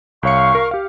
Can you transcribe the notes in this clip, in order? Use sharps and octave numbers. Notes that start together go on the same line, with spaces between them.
C2 C#5 F5 C#6 C#7
A#4
G4 F5